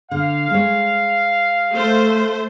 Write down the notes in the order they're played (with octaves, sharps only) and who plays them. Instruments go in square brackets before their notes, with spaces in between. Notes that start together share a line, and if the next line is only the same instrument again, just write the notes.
[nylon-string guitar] D3 [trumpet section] F5
[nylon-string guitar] G#3 C#5
[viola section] A3 C5